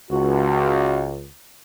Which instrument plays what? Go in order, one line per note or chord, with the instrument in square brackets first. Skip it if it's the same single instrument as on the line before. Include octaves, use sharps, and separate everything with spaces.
[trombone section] C#2 [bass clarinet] F#4